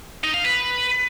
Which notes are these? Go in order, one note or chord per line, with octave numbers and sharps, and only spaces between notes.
D#4
F5
B4